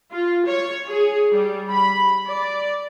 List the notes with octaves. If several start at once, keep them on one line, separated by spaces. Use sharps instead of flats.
F4
C#5
G#4
G3
B5
D5